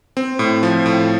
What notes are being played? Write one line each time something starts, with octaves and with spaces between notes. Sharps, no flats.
C4
A2
F3
A2